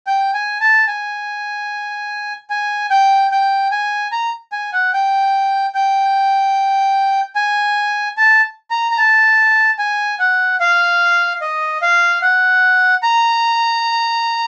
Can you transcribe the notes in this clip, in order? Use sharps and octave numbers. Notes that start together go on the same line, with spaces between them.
G5
G#5
A5
G#5
G#5
G5
G5
G#5
A#5
G#5
F#5
G5
G5
G#5
A5
A#5
A#5
A5
G#5
F#5
F5
D#5
F5
F#5
A#5